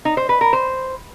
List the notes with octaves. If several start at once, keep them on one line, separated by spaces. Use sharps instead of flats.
D#4
C5
B4
A#4
C5